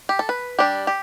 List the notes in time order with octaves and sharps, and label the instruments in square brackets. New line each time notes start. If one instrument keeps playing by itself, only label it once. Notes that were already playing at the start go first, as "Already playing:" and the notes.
[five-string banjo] G4
A4
B4
G3 D4 G4
G4